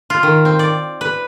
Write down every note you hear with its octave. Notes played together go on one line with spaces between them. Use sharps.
F4
D#3
C4
D5
B4